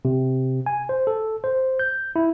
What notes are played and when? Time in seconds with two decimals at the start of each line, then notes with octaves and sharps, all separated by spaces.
0.05 C3
0.66 G#5
0.89 C5
1.07 A4
1.44 C5
1.79 G6
2.16 E4